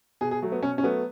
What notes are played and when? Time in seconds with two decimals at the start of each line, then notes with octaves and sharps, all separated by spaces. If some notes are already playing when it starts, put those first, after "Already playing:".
0.21 B2 G#4
0.31 G#4
0.42 F#3 A3
0.52 B3
0.63 B2 C#4
0.78 C#4
0.83 F#3 A3 B3